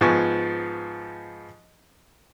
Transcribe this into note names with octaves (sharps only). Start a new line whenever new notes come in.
G#2 F3 B3 G#5 C#6